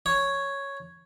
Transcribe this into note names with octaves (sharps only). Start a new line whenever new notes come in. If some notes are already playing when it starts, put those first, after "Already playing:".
C#5